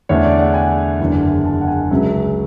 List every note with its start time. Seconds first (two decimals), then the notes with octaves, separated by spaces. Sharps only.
0.09 E2 D3 A3 D4 C#5
0.25 D5
0.39 F#5
0.54 G#5
1.00 F#1 E2 D3
1.45 A5
1.61 F#5
1.67 G#5
1.90 C#2 C#3 F#3 C#4 E5